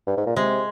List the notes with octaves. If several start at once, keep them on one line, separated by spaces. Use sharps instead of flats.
G2
G#2
A#2
C3 G#3